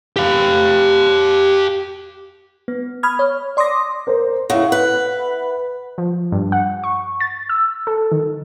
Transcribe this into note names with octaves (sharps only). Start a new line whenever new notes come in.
G4 F5
B3
B5 D#6 F6 G#6
C#5
D5 C6 D6 D#6 A#6
A#4 C5
C#3 E4 F#5
B4
F3
G2
F#5
C#6
A6
E6
A4
D#3